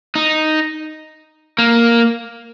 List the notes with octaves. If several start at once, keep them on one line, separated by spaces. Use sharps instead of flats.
D#4
A#3